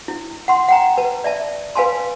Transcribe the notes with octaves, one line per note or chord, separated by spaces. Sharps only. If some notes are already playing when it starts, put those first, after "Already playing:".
E4
F#5 C6
F#5 G5 A#5
B4 A5
D5 E5 A5
B4 F5 G#5 A5 C6